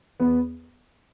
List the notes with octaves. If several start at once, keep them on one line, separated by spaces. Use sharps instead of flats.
E2 B3